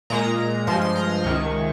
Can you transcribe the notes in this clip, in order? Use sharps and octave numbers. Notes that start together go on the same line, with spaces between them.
A#2 G#3 A#5
G2 F3 G#3 C6
C6
A#5
C6
C#2 C3 D#3 G#3 C#6